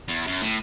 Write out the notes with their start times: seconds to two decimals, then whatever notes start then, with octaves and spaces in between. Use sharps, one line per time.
0.08 E2
0.27 F#2
0.42 A2